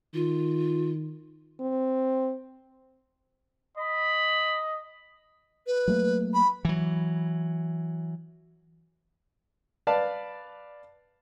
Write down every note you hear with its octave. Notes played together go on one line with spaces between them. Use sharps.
D#3 F4
C4
D#5 B5
B4
F#3 A3 A#3
B5
E3 F#3
B4 D5 F5 A5